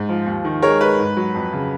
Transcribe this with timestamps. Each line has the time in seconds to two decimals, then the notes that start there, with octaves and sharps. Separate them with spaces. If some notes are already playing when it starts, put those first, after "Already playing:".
Already playing: G#2
0.09 F3
0.26 D#2
0.45 D#3
0.62 G#3 A#4 C#5
0.81 G#3 B4
0.99 G#2
1.17 F#3
1.35 F2
1.53 C#3